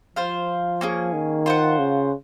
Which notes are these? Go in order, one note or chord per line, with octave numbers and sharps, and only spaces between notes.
F3 F4 C5 F5
A#3 C#4 G#4
D#3
F4 C5 F#5
C#3